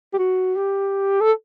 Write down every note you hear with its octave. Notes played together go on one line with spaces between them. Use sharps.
G4
F#4
G4
A4